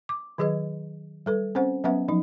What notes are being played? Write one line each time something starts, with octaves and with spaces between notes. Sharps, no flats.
D6
D#3 F#3 G#4 B4 D#5
G3 A4 B4
C4 C#4 C5 F#5
F#3 B3 C#4 B4 E5 F#5
F3 F#3 D#4